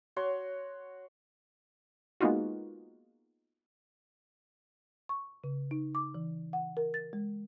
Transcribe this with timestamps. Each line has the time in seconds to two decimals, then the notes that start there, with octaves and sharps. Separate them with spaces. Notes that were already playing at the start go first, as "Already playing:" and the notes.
0.16 F#4 C#5 C6
2.21 G#3 A#3 B3 D#4 F4 F#4
5.09 C#6
5.44 C#3
5.71 D#4
5.95 D6
6.15 E3
6.53 F#5
6.77 A#4
6.94 A6
7.13 G#3